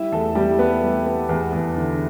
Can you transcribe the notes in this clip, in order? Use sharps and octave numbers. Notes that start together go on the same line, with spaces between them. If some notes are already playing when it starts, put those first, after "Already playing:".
Already playing: G3 E4 E5
E2 A3 A4
G3 B3 G4
B3 B4
G3
B3
E2
E2
D3